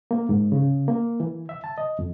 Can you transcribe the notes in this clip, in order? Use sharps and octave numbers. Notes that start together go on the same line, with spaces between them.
A#3
G#2
C#3
A#3
E3
E5
A5
D#5
F2